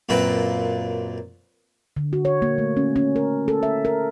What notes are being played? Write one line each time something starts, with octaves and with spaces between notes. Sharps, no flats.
F#2 A#2 C4 B4
D3
F#4
C#5
A#3
A3
C#4
C#4
A#4
A4
E5
A#4